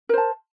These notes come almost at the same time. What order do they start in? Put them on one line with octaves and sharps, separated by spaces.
A#4 C5 A5